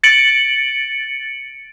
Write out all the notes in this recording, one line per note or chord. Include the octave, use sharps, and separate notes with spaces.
A6 C#7 D7 F#7